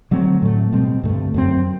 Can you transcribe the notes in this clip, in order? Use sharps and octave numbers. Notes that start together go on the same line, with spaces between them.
D3 F#3 A3 C4
A2 F#3 A3
B2 G3 C4
G2 D3 A3
F#2 F#3 A3 C4